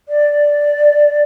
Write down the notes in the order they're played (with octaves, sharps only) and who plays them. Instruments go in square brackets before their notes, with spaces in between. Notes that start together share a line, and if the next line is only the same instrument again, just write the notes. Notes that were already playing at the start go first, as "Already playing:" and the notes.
[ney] D5